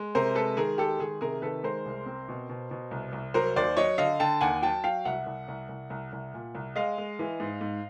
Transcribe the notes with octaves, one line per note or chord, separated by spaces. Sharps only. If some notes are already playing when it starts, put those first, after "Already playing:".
Already playing: G#3
C3 A#4 C5
G#3 A4 B4
D#3 G#4 A#4
G#3 G4 A4
D#3 G#4
C3 G#4 A#4
D#3 A4 B4
G#3 A#4 C5
C2
C4
B2
B2
B2
C2
C2
F#3 A#4 C5
D#2 C5 D5
F#3 C#5 D#5
D3 D#5 F5
D3 G5 A5
D#2 F#5 G#5
F#3 G5 A5
F#3 F5 G5
C2 E5 F#5
C2
C2
C2
C2
C2
A#2
C2
G#3 D#5 F5
G#3
E3
G#2
G#2